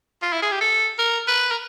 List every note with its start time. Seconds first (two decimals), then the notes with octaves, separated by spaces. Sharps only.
0.22 F4
0.33 E4
0.42 G#4
0.52 G4
0.61 A4
0.99 A#4
1.28 B4
1.51 A#4